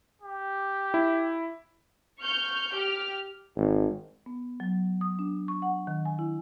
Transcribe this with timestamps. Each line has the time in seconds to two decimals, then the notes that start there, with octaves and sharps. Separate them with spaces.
0.22 G4
0.94 E4
2.22 C#6 F6 G6
2.75 G4 F6
3.56 G#1
4.26 B3
4.60 F#3
5.01 D#6
5.19 D4
5.48 C#6
5.62 F#5
5.87 D#3
6.05 G#5
6.19 E4